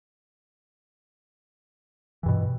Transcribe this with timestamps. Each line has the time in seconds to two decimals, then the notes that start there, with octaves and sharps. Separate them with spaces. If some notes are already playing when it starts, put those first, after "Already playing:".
2.23 E3
2.26 G2
2.28 B2